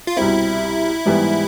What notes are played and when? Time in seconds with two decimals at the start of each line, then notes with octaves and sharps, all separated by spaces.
0.07 F4
0.17 C2 B2 G3 C4 E4
1.06 G#2 E3 G3 B3